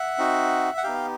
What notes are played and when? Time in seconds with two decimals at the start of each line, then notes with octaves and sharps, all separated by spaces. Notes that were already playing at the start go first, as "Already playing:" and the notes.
Already playing: E5 F#5
0.18 C4 D#4 F#4
0.77 F#5
0.83 B3 D#4 G4 F5 G5